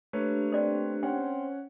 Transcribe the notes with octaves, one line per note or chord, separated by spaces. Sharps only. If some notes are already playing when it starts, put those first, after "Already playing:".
A3 A#3 D4 G4 B4 C#5
C4 C5 D5
C4 C#4 C#5 F#5 G5